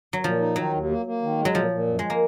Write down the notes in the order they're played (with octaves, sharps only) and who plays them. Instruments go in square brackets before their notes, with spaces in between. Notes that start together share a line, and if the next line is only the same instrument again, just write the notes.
[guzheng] F#3
[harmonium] A#2 [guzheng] F3
[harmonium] D#4
[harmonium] D#3 [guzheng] F#3
[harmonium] D#2
A#3
A#3
D#3
G#3
[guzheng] F#3
[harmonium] A#2 [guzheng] F3
[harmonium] A#2
F#2
[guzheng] G#3
A#3